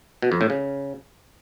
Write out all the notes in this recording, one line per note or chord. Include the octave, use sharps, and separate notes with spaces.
B2
F2
A2
C#3